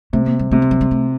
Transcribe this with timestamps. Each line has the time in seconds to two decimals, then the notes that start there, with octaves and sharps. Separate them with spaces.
0.13 C3 A3
0.26 A#3
0.39 G3
0.51 C3 A3
0.62 G3
0.71 F#3
0.81 G3
0.91 A3